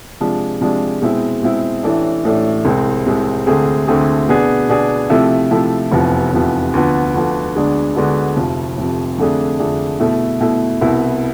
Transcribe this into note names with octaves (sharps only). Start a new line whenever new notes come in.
C3 F3 G#3 D4
C3 F3 G#3 D4
B2 G#3 C4 E4
B2 G#3 C4 E4
A1 A2 E3 A3 D4
A1 A2 E3 A3 D4
C2 C3 G#3 C4
C2 C3 G#3 C4
D2 D3 A3 C4 G#4
D2 D3 A3 C4 G#4
B2 B3 D4 G#4
B2 B3 D4 G#4
C3 F3 A3 E4
C3 F3 A3 E4
F1 E2 C3 F3 B3
F1 E2 C3 F3 B3
D2 D3 F3 B3
D2 D3 F3 B3
D2 D3 G#3 B3 D4
D2 D3 G#3 B3 D4
F1 F2 C3 F3
F1 F2 C3 F3
F2 D3 A3 D4 G#4
F2 D3 A3 D4 G#4
B2 A3 E4
B2 A3 E4
C2 B2 B3 E4